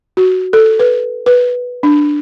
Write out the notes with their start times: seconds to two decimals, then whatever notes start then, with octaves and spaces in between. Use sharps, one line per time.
0.17 F#4
0.53 A4
0.80 B4
1.26 B4
1.83 D4